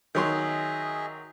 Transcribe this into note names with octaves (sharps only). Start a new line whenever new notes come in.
D#3 F#3 G#4 D#5 E5 C6